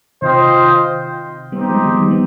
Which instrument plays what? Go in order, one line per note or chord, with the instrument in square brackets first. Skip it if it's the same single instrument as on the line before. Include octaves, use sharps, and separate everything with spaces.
[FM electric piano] C3 D#3 [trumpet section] F4 C5 D#5 G5
[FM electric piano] G3 B3 [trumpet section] C4 D#4 G4
[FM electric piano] F3 G#3
D#3 G3
D#3 G3
B3